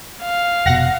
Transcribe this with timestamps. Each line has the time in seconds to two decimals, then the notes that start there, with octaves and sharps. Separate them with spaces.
0.23 F5
0.66 F1 B2 F#5 A#6